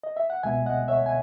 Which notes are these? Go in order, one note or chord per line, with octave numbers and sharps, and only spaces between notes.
D#5
E5
F#5
C#2 B2 G#3 B3 E5 G#5
D#5 F#5
C#5 E5
G#5